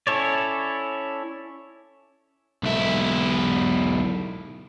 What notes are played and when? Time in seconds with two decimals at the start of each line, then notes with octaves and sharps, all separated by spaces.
0.07 C#4 E4 A4 C#5 D5
2.64 B1 E4